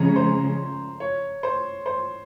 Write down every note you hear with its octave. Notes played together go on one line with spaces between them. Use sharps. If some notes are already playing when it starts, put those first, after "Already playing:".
Already playing: C#3 F3 G#3 C#4 A#5
C5
C#5
C5
C5